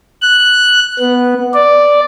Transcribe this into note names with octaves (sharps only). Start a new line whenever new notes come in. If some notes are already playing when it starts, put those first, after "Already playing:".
F#6
B3
D5